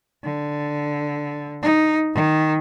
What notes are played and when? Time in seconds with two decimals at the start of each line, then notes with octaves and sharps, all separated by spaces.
0.24 D3
1.62 D#4
2.15 D#3